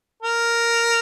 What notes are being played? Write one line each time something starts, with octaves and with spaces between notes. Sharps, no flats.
A#4